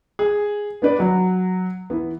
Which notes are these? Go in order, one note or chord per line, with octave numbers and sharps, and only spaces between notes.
G#4
B3 D4 B4 D5
F#3 F#4
E3 B3